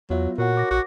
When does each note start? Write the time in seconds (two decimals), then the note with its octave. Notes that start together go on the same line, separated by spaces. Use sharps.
0.10 E2 F#3 B3 F4 E5
0.38 A#2 F#4 A#4 C#5 F#5
0.57 D6 A#6
0.71 A#1 F#4